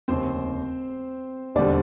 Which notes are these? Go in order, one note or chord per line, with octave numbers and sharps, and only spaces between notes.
F1 D#2 C#3 C4 C5
E1 D#2 D3 G3 C4 D4 D5